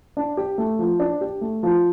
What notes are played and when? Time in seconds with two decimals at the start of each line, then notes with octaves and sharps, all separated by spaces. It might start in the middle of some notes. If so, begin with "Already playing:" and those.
0.17 D4
0.37 G4
0.58 A3
0.79 F3
1.00 D4
1.21 G4
1.41 A3
1.63 F3